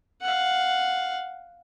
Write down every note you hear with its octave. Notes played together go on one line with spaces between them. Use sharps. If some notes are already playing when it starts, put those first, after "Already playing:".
F5 F#5